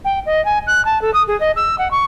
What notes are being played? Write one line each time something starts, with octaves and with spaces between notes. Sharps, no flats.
G5
D#5
G#5
F#6
A5
A4
D#6
G#4
D#5
E6
F#5
C#6